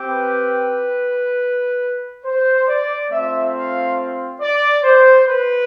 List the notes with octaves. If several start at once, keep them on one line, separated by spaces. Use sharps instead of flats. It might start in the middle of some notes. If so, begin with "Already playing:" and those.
Already playing: C4 G4
B4
C5
D5
A3 C4 F4 E5
F5
D5
C5
B4